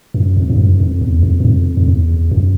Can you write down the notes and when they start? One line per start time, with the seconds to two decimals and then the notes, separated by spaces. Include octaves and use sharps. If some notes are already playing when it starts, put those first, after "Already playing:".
0.14 F#2
0.37 F2
0.50 G2
0.58 F#2
0.80 F2
1.01 E2
1.23 F2
1.40 F#2
1.45 F2
1.77 F2
1.88 E2
2.31 F#2